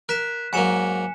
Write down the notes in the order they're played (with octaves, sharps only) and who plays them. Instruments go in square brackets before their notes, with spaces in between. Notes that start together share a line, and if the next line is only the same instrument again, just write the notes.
[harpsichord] A#4 [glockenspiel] F#6 B6 E7
[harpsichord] G#2 F#3 A#3 [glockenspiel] G#5 C#7 E7